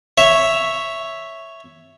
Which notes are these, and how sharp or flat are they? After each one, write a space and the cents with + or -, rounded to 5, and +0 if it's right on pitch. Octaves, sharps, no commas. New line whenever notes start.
C#5 +0 E5 +0